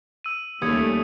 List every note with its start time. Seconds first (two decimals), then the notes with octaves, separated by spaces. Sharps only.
0.24 E6 D#7
0.62 D#2 G3 A3 C#4 D#6 G#6 C#7